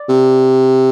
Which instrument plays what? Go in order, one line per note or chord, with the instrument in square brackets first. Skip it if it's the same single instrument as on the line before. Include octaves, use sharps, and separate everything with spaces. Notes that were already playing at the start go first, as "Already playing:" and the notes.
Already playing: [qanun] D5
[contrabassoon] C3